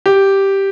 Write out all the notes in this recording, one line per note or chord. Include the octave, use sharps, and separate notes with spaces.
G4